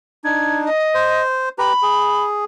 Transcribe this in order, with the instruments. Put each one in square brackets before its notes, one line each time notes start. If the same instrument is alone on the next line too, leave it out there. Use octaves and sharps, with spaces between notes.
[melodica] D4 D#4 [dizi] G#6
[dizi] D#5
[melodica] C5
[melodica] G4 B4 A#5 [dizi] B5
[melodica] G#4